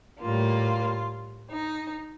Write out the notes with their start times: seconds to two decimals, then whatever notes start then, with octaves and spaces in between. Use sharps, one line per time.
0.21 A2 G3 A#3 F4
1.50 D#4